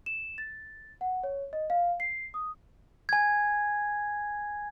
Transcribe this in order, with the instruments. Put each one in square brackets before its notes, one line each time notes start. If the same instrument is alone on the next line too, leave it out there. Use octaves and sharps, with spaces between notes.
[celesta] E7
A6
F#5
C#5
D#5
F5
C7
D#6
[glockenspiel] G#5 G#6